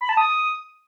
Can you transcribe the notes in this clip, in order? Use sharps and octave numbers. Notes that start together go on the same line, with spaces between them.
B5
A5
D#6